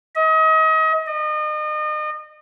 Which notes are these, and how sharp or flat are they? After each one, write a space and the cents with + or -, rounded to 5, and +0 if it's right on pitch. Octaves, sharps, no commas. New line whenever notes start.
D#5 +35
D#5 -35